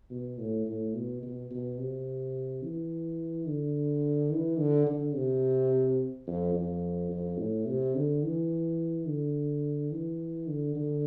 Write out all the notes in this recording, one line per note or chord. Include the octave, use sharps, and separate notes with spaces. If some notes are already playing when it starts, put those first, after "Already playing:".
B2
A2
A2
B2
B2
B2
C3
E3
D3
E3
D3
D3
C3
F2
F2
F2
A2
C3
D3
E3
D3
E3
D3
D3